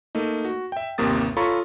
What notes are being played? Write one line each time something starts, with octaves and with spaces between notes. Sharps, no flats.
A3 A#3 D#4
F#4
E5 G5
G1 D#2 C3 A#3 D#6 A6
F4 A4 C#5 A#5 B5 C#6